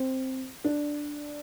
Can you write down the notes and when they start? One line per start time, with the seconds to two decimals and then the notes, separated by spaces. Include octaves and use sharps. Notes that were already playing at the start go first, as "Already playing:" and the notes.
Already playing: C4
0.64 D4